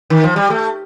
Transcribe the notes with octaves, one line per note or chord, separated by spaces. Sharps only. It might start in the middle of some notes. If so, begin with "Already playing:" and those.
D#3
F3
G3
A3